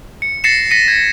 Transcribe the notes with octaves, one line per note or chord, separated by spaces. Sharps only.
C#7
A6 A#6 C7 C#7 E7
A#6 B6 C#7 D#7
G#6